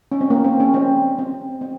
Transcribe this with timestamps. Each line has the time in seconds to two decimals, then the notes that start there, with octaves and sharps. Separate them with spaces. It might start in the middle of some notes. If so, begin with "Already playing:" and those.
0.12 C#4
0.21 C4
0.30 A#3
0.44 C4
0.60 C#4
0.74 C4
1.18 C4
1.61 C4